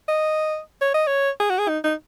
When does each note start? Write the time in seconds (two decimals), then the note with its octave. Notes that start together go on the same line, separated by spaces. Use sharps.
0.08 D#5
0.81 C#5
0.94 D#5
1.07 C#5
1.40 G#4
1.50 F#4
1.59 G#4
1.68 D#4
1.84 D#4